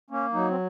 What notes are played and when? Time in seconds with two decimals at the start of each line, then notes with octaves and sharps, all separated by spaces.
0.10 A#3 C#4
0.33 F#3 D#4
0.49 C4